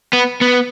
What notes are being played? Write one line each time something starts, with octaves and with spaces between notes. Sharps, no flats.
B3
B3